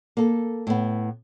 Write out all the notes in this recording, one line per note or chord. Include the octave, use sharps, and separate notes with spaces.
A#3 A4
A2 B3